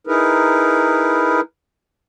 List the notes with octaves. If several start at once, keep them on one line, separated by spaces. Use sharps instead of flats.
D#4 E4 G#4 A#4 B4